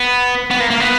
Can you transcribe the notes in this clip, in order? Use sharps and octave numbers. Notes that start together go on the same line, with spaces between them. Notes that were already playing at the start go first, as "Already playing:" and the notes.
Already playing: B3
B3
A#3
A#3
B3